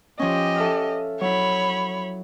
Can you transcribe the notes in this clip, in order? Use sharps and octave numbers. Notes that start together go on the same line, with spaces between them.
F3 C#4 G4 D#5
A4 E5 F5
F#3 E4 C#5 B5